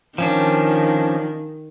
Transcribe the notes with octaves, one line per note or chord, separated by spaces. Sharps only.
D#3 F3 C#4 D4